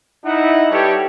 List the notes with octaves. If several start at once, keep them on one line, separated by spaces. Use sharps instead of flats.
D#4 E4 F#5
G3 G4 A4 B4 C#5